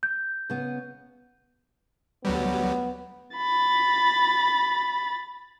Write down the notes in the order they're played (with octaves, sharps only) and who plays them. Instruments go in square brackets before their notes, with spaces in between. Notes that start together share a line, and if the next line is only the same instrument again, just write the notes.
[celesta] G6
[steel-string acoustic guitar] C#3 B3
[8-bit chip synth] D2 F#3 G3 [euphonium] B3
[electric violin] B5 A6